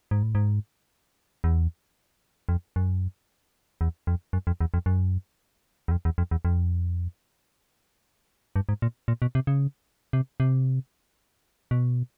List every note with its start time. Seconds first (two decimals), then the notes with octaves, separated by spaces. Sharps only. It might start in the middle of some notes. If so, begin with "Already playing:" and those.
0.11 G#2
0.23 A2
0.35 G#2
1.44 E2
2.49 F2
2.76 F#2
3.81 E2
4.07 F2
4.33 F#2
4.47 F2
4.61 E2
4.74 F2
4.86 F#2
5.88 E2
5.91 F2
6.05 E2
6.18 F2
6.31 E2
6.45 F2
8.56 G2
8.69 G#2
8.82 A#2
9.08 A#2
9.22 B2
9.35 C3
9.47 C#3
10.13 C3
10.40 C3
11.71 B2